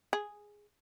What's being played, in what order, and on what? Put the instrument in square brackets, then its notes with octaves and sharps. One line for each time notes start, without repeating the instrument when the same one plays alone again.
[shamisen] G#4